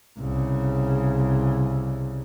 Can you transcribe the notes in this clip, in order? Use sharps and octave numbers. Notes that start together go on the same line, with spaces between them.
C2 C#3